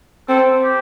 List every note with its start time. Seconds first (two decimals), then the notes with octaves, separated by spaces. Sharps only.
0.29 C4 A4
0.63 G4